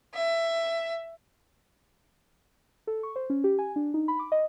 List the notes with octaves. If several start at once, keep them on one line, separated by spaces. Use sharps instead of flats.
E5
A4
C#6
C5
C#4
G4
G#5
D4
D#4
B5
D6
D#5